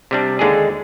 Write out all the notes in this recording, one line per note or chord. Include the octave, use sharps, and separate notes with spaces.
C3 G3 D4
D#2 D3 G#3 D4 G#4